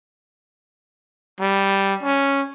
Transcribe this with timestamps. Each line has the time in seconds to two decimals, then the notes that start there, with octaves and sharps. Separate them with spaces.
1.40 G3
2.03 C#4